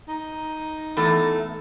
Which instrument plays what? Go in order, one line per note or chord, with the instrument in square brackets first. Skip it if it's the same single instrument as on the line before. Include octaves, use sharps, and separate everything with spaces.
[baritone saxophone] D#4
[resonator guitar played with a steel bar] E2 A3